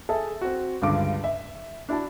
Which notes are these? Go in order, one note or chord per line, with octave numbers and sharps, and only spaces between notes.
G#4 A4 E5 A5
C4 F#4
C#2 G2 D3 D6
E5
D4 E4 F#4 A5